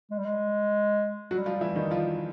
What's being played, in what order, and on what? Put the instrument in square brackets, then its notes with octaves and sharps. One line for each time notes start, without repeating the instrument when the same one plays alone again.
[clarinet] G#3
G3
G#3
[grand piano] F#3 F#4 [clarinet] G3
[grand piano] F3 F4
E3 E4
D#3 D#4
F3 F4